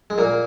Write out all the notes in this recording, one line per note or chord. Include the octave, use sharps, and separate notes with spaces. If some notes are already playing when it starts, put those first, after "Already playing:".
G#3
A#2 A#3